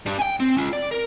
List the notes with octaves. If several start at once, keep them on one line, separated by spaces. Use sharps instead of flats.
G3 D4
G5 G#5
C4
C#4 F4
D5
A#4